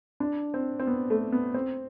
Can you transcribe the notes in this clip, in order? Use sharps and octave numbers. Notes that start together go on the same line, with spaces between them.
D4
C4
C4
B3
A3
B3
C4